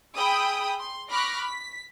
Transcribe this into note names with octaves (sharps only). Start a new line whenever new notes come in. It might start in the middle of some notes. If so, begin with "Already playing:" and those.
G#4 G5 B5 D#6 E6
C6
B5 C#6 D6 F6 F#6 A#6
B6